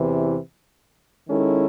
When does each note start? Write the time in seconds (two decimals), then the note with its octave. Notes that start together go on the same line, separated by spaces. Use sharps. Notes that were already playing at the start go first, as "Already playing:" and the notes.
Already playing: E2 C3 E3
1.28 D#3 G#3 C#4 E4 A4